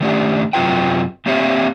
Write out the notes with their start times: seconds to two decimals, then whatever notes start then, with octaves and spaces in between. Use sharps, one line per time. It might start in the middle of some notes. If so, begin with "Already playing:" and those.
0.01 D#3 A3 C#4 D4 G4
0.53 F#2 C3 F#3 F4 B4 G5
1.26 A#3 C4 G4 C#5 E5 F5